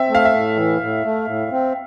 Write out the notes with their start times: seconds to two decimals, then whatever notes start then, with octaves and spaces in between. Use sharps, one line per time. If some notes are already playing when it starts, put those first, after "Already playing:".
Already playing: C4 E5
0.09 A3
0.15 F5
0.25 E5
0.34 A2
0.56 E3
0.81 A2
1.05 A3
1.27 A2
1.51 C4